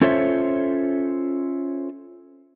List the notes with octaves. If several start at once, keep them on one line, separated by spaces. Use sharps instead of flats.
C#4 F4 A4 C5 C#5 E5